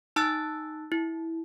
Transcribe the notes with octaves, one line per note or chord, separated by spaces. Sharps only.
D#4 A5 E6 F#6 A6
E4